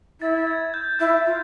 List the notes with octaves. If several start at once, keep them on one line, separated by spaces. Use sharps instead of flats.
E4 A6
G#6
G6
E4 G6
F4